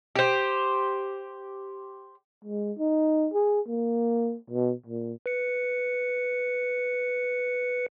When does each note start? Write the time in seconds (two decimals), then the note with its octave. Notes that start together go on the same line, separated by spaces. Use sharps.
0.16 G4 C5
2.45 G#3
2.79 D#4
3.34 G#4
3.68 A#3
4.50 B2
4.86 A#2
5.26 B4 C#7